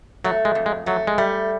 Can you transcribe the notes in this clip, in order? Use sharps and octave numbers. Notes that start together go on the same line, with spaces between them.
F#3 A3
G#3
F2
G#3
F#3 A3
G#3
G3 A3